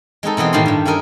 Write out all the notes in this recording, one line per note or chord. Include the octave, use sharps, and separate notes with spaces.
G#3 C4 D#4 A4
B2 E3 B3 C4
A2 D#3 G4 F5 B5 C6
G2 G3
C#4 E4 A4 A#4 D#5